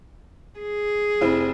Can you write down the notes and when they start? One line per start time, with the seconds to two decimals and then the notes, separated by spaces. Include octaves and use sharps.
0.59 G#4
1.21 F1 C4 E4